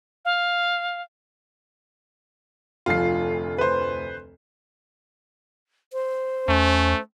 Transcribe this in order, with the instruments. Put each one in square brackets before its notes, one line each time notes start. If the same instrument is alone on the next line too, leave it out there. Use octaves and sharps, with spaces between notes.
[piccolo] F5
[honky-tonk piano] F1 D2 F3 [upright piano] F4 C7
[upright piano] B4 C5
[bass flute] C5
[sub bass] E2 [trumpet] A3 [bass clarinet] C#4